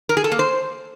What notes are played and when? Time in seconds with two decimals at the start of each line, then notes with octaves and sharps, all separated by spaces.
0.09 A#4
0.17 G#4
0.24 A4
0.32 A#3
0.39 C5